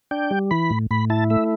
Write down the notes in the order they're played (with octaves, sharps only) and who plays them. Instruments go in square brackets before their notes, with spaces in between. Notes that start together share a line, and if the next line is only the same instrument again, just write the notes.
[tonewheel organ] D4 G5
G3
E3 B5
A2
A2 B5
E4 A5
A3 E5